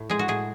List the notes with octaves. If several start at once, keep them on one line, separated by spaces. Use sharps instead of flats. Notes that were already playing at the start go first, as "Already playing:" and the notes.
Already playing: A2
G#3 G#4
F#4
A2 G#4